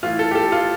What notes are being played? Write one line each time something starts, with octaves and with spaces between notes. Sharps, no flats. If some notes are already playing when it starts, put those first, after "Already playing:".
A2 E3 F4
A4
G4
A4
F4